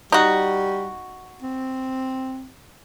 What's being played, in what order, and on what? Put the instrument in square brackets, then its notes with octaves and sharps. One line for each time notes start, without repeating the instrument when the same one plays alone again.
[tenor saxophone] G3 [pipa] D#4 F#4
[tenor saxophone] C4